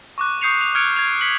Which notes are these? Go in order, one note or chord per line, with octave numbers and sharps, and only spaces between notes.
C#6 D6 F#6
C#6 D#6 G6 C7 C#7 F7
F7
F6 F#6 G#6 C#7 D7 F7
G#6 F7
B6 C#7 F#7